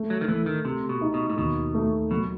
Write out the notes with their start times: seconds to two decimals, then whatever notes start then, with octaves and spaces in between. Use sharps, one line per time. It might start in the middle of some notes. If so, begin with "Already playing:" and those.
Already playing: A3
0.10 F#3
0.21 D#3
0.28 E3 A3
0.46 D#3
0.65 C3 G4
0.89 B2
1.01 D#4
1.14 B2
1.30 A2
1.38 D#2 B2
1.74 A3
2.11 B2 F#3